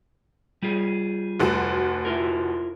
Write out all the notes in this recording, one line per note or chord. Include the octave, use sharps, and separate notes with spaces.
G3 F4 G#4
F1 D2 F#4
E4 F4 A#4